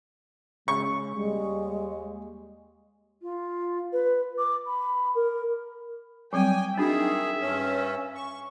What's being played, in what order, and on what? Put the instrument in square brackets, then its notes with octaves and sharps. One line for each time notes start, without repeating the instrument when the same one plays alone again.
[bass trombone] C#3 [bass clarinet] G#3 [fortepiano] C#6
[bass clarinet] D#2 [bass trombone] G3 [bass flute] G#3
[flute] F4
B4
D6
B5
A#4
[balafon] F#3 G3 C4 [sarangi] G5 [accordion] G#5
[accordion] D#3 G#4 [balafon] D4 D#4 F#4 [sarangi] E5
[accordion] G2 C#4
C#6